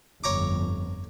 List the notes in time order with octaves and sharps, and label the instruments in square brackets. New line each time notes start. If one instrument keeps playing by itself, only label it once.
[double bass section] G1 F2 [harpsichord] C#5 A#5 D6